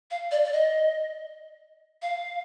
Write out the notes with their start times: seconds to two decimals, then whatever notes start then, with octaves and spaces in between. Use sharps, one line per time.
0.11 F5
0.31 D5
0.44 D5
0.53 D#5
2.02 F5